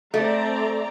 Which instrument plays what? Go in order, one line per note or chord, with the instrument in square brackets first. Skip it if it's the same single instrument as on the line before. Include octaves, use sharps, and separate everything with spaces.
[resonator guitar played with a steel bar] A3 [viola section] C4 D5 A#5